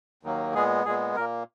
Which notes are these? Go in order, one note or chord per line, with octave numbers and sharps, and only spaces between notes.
D#2 D#3 F#3 A#3
A#2 G#3 B3 G#4
A#2 G#3 B3 G#4
A#2 A#3 A#4